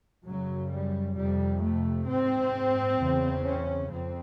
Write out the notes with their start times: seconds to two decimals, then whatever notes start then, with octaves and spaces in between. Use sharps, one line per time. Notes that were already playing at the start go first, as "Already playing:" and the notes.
0.24 F#2 C#3 F#3
0.70 G3
1.15 F2 C3 G3
1.60 A3
2.06 G#2 C4
2.98 E2 C#3
3.45 C#4
3.90 F2 C4